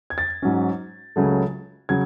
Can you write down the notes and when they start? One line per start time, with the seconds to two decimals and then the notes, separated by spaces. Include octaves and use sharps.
0.10 G#6
0.18 A6
0.42 G#2 F#3 C#4
1.16 C#2 C#3 F#3 A3
1.89 C#3 F#3 G#6